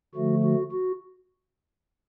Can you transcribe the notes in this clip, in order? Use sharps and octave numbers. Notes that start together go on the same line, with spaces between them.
D3 F3 A3 F#4
F#4
F#4